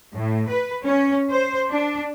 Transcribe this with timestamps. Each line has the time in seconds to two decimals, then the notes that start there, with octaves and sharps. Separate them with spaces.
0.15 A2
0.49 B4
0.85 C#4
1.30 C5
1.70 D4